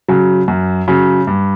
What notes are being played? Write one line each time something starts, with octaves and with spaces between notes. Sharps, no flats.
C#3 F#3
F#2
C#3 F#3
G2